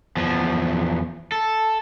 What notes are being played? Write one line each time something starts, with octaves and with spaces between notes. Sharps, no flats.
E2 F3
A4